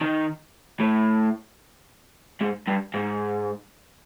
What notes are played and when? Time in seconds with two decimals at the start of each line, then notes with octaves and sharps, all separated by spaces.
0.01 D#3
0.80 A2
2.41 G#2
2.68 G2
2.94 G#2